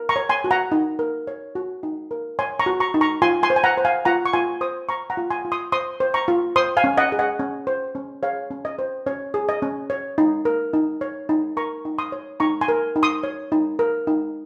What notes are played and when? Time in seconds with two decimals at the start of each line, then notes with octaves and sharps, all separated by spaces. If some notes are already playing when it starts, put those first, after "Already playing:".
Already playing: A#4
0.09 A#5 C#6
0.16 C#5
0.29 G#5 C6
0.44 F#4
0.51 F#5 A#5
0.72 D#4
0.99 A#4
1.27 C#5
1.55 F#4
1.83 D#4
2.11 A#4
2.39 C#5 G#5 C6
2.60 A#5 C#6
2.66 F#4
2.80 A#5 C#6
2.94 D#4
3.01 A#5 C#6
3.22 F4 G#5 C6
3.43 G#5 C6
3.50 C5
3.56 G#5
3.64 F#5 A#5
3.78 C5
3.85 F5 G#5
4.05 F4 F#5 A#5
4.26 C#6
4.33 F4 G#5 C6
4.61 C5 C6 D#6
4.89 C5 A#5 C#6
5.10 F#5 A#5
5.17 F4
5.30 G#5 C6
5.45 F4
5.52 C6 D#6
5.72 C5 C6 D#6
6.00 C5
6.14 A#5 C#6
6.28 F4
6.56 C5 C6 D#6
6.77 F5 G#5
6.84 C#4
6.98 D#5 F#5
7.12 G#4
7.19 D#5 F#5
7.39 C#4
7.67 C5
7.95 C#4
8.23 G#4 C#5 F5
8.51 C#4
8.65 D#5
8.79 C5
9.06 C#4 C#5
9.34 G#4
9.49 D#5
9.62 C#4
9.90 C#5
10.18 D#4
10.45 A#4
10.73 D#4
11.01 C#5
11.29 D#4
11.57 A#4 A#5 C#6
11.85 D#4
11.99 C6 D#6
12.12 C#5
12.40 D#4 A#5 C#6
12.61 G#5 C6
12.68 A#4
12.96 D#4
13.03 C6 D#6
13.23 C#5
13.52 D#4
13.79 A#4
14.07 D#4